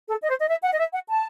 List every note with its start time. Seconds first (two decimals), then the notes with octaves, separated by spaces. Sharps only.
0.08 A4
0.22 D#5
0.29 C5
0.39 D#5
0.49 E5
0.63 F#5
0.73 D#5
0.78 E5
0.93 F#5
1.08 A5